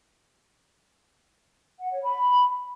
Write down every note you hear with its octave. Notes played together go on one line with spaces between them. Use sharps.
F#5
C#5
B5